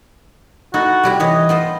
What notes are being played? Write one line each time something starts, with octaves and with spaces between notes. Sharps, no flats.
D#4 E4 F#4 A4
C3 G3 E4
E3 C#5 D#5
B3 F4 C5